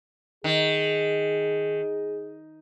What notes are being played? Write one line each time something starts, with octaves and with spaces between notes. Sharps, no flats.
D#3 G#4